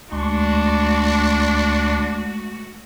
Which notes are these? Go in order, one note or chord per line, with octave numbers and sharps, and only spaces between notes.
D2 G#3 A3 D4 F#4 C6 C#6